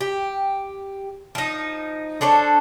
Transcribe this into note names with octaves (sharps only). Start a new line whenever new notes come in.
G4
F3 D#4
D4 A4 C5 C#5